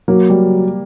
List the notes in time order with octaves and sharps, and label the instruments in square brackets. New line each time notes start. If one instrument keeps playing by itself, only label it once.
[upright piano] F#3 [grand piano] A#3
[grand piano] G3